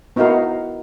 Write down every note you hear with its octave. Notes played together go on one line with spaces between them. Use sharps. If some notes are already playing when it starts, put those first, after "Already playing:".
B3 D#4 E4 F#4 A#4 F5